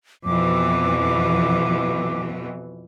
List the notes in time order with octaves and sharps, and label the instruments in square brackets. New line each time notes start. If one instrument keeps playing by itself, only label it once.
[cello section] F2 B2 E3 [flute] D6